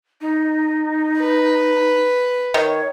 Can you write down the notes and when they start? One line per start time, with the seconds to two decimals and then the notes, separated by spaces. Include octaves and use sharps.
0.21 D#4
1.19 B4
2.54 D#3 C#5